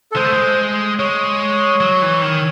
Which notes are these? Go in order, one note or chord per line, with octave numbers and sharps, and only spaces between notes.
A4
G#3 C5
A3
G#3
G#3 C#5
F#3
E3
D#3